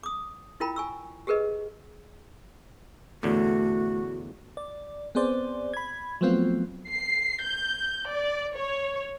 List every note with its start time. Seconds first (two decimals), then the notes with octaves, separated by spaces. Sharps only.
0.03 D6 D#6
0.60 E4 F4 A#4 G5 A#5 B5
0.76 G#5 C#6 E6
1.27 G4 G#4 A#4 B4 D#5
3.23 E2 A2 D3 A3 F#4
4.57 D5
5.15 B3 C4 G#4 C5 D5
5.74 B5 G#6
6.21 F3 F#3 A3 B3 C4 F4
6.87 C7
7.43 G6
8.10 D5
8.55 C#5